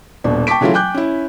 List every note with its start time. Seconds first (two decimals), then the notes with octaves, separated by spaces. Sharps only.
0.24 D#1 B2 D4
0.47 G5 A5 C#6 D6 B6 D7
0.61 C#3 E3 F#3 A3 C#4 F4
0.74 G5 G#5 D6 F#6 G6
0.94 C#4 E4